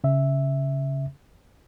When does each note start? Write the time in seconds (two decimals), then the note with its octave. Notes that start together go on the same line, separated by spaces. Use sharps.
0.04 C#3 E5